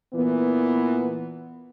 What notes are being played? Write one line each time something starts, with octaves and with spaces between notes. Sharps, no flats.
A#2 E3 B3